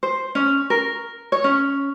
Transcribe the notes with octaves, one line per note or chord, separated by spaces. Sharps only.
C5
C#4
A#4
C#5
C#4